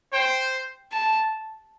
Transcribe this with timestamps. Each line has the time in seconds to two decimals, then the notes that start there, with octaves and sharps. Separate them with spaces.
0.13 C5 G5
0.92 A5